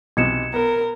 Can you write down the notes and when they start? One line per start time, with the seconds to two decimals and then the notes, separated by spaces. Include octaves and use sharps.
0.17 B1 C3 E3 D#4 D#5 G#6 C#7 E7
0.54 B3 A#4